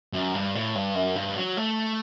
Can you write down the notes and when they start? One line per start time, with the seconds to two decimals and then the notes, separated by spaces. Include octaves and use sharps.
0.13 F#2
0.34 G2
0.55 A2
0.75 G2
0.95 F#2
1.16 G2
1.36 F#3
1.57 A3